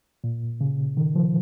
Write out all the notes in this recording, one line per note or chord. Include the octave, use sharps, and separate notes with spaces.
A#2
C#3
D#3
F3